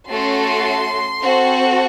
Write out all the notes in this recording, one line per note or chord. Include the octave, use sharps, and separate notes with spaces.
A3 C#4 F#4 A4 C6
C4 F#4 A4